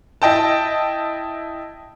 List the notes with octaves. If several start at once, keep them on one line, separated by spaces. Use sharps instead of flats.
E4 D#5 G5 A5